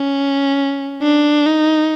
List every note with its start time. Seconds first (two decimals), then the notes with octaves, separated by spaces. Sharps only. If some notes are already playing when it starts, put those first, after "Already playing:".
Already playing: C#4
1.02 D4
1.46 D#4